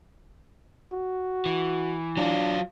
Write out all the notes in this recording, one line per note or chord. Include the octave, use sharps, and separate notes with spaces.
F#4
E3
F#3 D4 F4